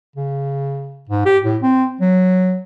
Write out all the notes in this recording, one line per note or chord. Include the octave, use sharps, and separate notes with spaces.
C#3
G#2
G4
A2
C4
F#3